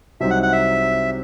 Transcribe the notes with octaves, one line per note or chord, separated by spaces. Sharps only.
C2 C3 F#3 C4 D#4 E5
F#5
F#5
E5